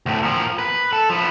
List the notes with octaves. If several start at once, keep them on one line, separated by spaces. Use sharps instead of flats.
D2 A2
A#2 F3
B4
A4
F3 B4